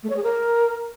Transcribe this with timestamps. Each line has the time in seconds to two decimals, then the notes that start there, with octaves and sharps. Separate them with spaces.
0.03 A3
0.10 C#5
0.17 G#4
0.23 A#4